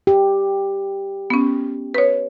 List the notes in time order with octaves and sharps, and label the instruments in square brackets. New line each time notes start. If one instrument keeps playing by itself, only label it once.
[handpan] G4
[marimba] B3 C#4
B4 C#5